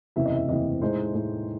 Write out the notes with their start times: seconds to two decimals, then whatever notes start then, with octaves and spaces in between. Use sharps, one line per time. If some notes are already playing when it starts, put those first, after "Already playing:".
0.16 F#1 E2 C3 E3 E5
0.25 D#5
0.34 E5
0.48 F#1 E2 C3 E3 D#5
0.81 A2 G#3 D#4 C5
1.14 A2 G#3 D#4